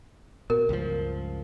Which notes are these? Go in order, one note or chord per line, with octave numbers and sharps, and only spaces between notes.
B2 A#4
C#2 G2 F3